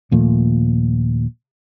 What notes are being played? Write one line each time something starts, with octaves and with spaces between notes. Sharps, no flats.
D#2 A#2 F3 A3